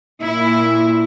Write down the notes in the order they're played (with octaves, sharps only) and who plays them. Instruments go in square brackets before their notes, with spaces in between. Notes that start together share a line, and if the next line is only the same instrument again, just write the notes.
[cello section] A#2 E4